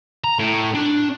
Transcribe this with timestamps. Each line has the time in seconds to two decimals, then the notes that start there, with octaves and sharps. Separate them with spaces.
0.24 A#5
0.39 A2
0.74 D4